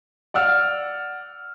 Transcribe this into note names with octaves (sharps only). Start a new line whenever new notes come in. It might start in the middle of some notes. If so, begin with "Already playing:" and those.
D5 F#5 E6 F6